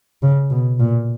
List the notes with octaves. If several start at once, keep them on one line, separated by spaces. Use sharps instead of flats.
C#3
B2
A#2